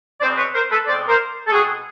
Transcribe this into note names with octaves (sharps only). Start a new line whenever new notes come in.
B2 G#3 C4 C5 D5
B4 C#5
A#4 C5
A4 B4
B2 G#3 C4 C5 D5
A#4 C5
A4
B2 G#3 C4 F#4 G#4